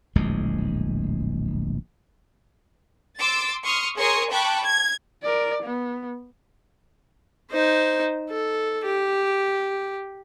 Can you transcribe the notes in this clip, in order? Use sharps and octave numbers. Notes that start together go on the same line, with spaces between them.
D1 A#1 E2 G#3
C6 D6 E6 A6
C6 C#6 D#6 F6
G#4 A#4 C#5 C6 C#6 D#6
G5 A5 B5 C#6 D6 F#6
G#6
A#4 D5
B3
D#4 C5
A4
G4